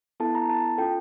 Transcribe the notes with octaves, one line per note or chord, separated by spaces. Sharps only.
B3 E4 A4 A5
A#5
A5
C#4 F4 A4 G5